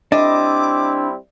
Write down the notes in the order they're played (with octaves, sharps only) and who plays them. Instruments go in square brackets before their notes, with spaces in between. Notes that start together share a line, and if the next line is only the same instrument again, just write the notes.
[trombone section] G3 C4 E4 [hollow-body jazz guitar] D4 [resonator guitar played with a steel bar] D#5 [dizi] D6